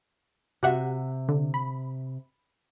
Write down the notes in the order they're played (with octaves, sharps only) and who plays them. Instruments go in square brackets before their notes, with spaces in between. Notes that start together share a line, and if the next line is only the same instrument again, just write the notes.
[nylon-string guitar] C3 E5 [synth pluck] F#4 G4 F#5
[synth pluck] D3
B5